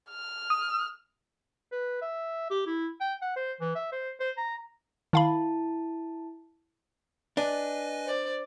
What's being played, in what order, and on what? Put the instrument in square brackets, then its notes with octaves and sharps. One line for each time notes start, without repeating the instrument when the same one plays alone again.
[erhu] F6
[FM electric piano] D#6
[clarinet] B4
E5
G4
E4
G5
F#5
C5
E3
E5
C5
C5
A#5
[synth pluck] D#3 F5 B5 [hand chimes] E4 A5
[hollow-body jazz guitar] D4 [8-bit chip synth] B4 D#5 G#5
[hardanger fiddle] C5 D5